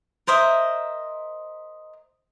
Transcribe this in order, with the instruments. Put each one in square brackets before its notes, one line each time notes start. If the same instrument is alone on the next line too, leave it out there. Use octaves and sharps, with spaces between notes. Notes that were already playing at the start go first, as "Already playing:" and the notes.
[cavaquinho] A#4 C5 D#5 E5